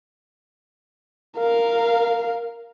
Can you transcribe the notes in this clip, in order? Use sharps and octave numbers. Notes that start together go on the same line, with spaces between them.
A#4 F5